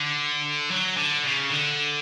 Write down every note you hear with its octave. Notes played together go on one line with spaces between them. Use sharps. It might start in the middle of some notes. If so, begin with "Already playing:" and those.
Already playing: D3
F#3
D3
C#3
D3